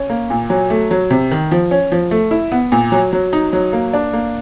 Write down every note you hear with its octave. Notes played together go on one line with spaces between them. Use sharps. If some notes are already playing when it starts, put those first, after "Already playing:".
Already playing: C#4
A#3
A#2
F#3
A3
F#3
C3
D#3
F3
C#4
F3
A3
E4
B3
A#2
F#3
F#3
D#4
F#3
A#3
D4
A#3